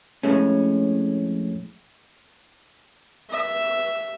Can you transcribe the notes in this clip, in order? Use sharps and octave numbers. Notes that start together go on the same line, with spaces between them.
F2 A2 G#3 A3 C#4
E5